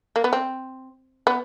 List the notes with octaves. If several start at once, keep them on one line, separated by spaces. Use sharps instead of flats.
A#3
B3
C4
B3